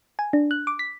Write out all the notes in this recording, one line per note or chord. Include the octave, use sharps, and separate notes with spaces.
G#5
D4
F#6
D6
B6